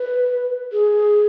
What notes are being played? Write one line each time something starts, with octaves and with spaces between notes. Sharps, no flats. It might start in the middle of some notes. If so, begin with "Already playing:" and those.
Already playing: B4
G#4